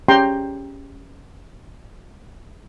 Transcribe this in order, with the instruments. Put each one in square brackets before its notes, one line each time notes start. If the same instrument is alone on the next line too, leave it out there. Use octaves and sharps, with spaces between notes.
[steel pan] C#4 G4 G5 A#5 C6